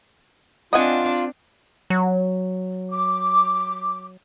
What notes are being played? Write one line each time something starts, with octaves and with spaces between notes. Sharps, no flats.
C4 D4 F4 D#5 F#5 G#5
F#3
D6